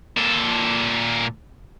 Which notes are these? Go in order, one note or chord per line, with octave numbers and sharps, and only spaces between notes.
A#2 A4